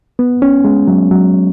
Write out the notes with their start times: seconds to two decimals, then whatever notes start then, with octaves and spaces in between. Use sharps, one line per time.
0.19 B3
0.42 C#4
0.65 G#3
0.87 F#3
1.11 F#3